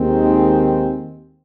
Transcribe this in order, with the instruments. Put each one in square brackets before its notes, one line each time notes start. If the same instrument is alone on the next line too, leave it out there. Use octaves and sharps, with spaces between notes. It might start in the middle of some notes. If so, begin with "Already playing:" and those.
Already playing: [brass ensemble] D#2 D#3 G#3 C4